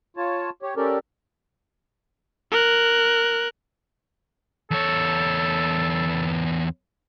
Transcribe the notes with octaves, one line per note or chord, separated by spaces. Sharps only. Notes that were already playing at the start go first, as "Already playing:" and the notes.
F4 C#5 A5
G4 C#5
C#4 G4 A4 A#4 D5
A#4 F#6
E2 A4 C#5